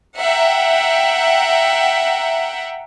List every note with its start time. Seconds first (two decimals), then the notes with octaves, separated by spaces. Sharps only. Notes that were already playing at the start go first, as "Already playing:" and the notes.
0.17 E5 F#5 G5 A#5